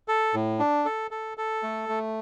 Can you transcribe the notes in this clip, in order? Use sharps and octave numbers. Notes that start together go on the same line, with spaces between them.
A4
A2
D4
A4
A4
A4
A3
A3